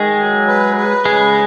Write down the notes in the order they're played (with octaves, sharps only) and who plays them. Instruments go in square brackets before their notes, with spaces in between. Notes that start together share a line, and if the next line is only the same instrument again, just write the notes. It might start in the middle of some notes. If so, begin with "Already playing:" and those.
Already playing: [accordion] D#3 [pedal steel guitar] G#3 G#4
[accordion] F#3
B4
B4
[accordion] C#3 [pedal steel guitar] G#3 G#4